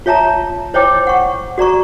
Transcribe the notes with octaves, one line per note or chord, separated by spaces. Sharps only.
F4 C#5 E5 A5 A#5
E4 C5 C#5 D#5 G5 D6
F#5 C#6
F#4 D5 A#5 C#6